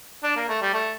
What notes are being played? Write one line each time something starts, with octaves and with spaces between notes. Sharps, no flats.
D4
A#3
A3
G3
A3